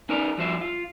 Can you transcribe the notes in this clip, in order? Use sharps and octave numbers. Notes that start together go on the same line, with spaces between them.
C#4 D#4 A#4 B4 D5 A#5
G2 F3 F#4 C5 E5
F4